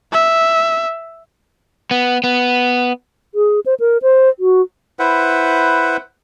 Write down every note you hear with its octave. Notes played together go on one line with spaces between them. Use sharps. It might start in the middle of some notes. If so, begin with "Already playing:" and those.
E5
B3
B3
G#4
C5
A#4
C5
F#4
E4 B4 C5 F#5